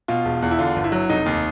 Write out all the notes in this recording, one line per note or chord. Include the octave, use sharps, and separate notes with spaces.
B2 F4
E1
E2
E4
D3 F4
G1 F4
E4
F#3
F1 D#4
D#2